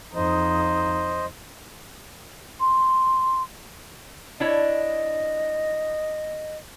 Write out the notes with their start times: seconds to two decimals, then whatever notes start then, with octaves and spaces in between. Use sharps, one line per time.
0.15 F2 D#4 C5 D#5
2.60 C6
4.40 D4 E4 C#5 D#5